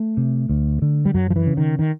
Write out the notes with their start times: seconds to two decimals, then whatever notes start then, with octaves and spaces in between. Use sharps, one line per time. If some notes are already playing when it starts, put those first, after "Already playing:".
Already playing: A3
0.17 C3
0.49 D2
0.82 D3
1.05 G3
1.14 F#2 F#3
1.30 F3
1.36 E3
1.47 C#3
1.57 D#3
1.79 D#3